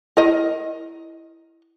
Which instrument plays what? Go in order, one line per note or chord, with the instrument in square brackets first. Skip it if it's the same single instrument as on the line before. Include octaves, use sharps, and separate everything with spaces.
[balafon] E4 [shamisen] A#4 D#5